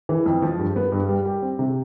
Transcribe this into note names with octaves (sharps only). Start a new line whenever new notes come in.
E3
F2
F3
G2
B3
G2
G3
G4
C4
C3